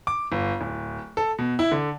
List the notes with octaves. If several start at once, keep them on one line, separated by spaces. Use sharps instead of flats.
D6
G1
D1
A4
B2
E4
D3